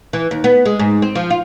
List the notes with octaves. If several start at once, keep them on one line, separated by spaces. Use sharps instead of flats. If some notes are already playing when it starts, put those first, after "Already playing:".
E3
D#2
B3
G#3
G#2
C4
F3
F4